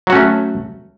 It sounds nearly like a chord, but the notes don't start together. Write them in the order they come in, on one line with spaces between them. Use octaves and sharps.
F#3 F#4 C#4 A3